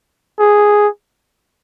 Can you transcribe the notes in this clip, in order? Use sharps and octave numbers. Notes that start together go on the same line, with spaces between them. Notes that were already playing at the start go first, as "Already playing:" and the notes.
G#4